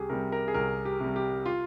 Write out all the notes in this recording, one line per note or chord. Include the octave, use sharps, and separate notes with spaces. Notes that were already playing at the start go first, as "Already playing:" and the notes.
Already playing: C2 G4 G#4
C3 G3 A#4
A#4
G#4
C2 A#4
G4
C3 G3
G4
F4